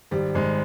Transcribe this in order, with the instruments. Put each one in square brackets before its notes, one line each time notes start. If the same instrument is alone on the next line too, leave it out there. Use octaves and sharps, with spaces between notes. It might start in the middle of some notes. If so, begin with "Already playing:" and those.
[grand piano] G#1 [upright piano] G3
[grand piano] G#1 [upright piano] G#3